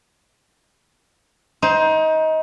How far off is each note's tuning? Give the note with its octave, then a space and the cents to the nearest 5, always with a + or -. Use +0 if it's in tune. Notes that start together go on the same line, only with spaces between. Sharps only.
D#4 +25 C5 +0